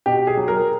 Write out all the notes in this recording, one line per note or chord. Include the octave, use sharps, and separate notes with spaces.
B2 G4
G#4
F#3
A#4